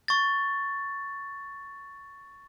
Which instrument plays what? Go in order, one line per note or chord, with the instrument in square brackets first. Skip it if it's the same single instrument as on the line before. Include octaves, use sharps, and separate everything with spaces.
[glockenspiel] C#6 A6